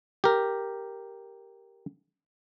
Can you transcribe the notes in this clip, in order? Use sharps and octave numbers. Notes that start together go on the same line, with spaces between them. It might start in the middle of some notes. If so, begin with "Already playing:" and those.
G4 A#4